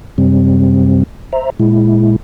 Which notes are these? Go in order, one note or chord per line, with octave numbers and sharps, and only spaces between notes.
F#2 C3 G3 C4
C5 E5 A#5
A#2 G#3 E4